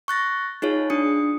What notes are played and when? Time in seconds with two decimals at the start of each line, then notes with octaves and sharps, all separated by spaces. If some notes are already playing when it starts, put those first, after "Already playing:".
0.08 C#6 F#6 A6 A#6
0.62 D#4 F4 G#4 C#5
0.90 D4 F4 D#6 C#7